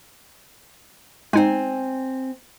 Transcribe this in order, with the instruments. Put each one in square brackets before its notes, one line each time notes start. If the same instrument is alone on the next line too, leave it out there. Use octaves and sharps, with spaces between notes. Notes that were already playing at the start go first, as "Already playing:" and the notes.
[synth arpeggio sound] G#3 D#4 [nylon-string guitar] C4 G#5